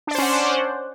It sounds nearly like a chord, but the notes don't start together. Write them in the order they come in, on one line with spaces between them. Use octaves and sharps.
D4 D5 C5 C#4 F#5